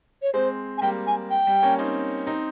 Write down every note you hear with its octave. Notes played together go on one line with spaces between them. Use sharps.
C#5
G#3 C4 C5
G#5
G3 A#3 G5
G#5
G5
G3
A#3 C#4
C4 D#4
C4 D#4